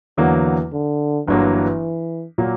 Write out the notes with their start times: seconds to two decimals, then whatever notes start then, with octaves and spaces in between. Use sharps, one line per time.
0.18 E2 D3 E3 F#3 A#3
0.72 D3
1.27 G1 G2 E3 F#3 A#3
2.38 A#2 F#3 A#3